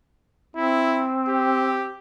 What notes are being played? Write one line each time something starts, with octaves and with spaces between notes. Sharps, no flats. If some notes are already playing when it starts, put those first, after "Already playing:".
C4 E4
G4